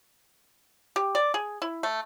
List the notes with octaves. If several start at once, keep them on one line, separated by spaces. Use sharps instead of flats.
G4
D5
G#4
E4
A3